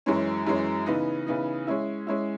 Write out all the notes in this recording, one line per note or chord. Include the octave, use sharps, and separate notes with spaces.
F#2 E3 G#3 C#4
F#2 E3 G#3 C#4
C#3 E3 B3 D#4
C#3 E3 B3 D#4
G#3 C#4 E4
G#3 C#4 E4